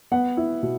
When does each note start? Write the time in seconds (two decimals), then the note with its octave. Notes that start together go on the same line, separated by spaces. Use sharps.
0.12 B3 F#5
0.37 E4
0.63 B2